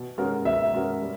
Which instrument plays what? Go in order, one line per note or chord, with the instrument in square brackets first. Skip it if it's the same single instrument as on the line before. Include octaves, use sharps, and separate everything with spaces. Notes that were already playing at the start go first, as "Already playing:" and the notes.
Already playing: [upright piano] B2
G#3 C#4 F#4 A#4
[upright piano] B2 [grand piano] E5
[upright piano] G#3 C#4 F#4 A#4
G3